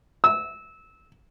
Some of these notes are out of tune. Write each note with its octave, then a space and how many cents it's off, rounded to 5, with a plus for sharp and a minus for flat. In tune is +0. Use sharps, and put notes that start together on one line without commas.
E6 -20